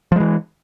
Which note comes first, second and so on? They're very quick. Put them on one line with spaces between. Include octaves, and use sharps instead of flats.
F3 G#3 E3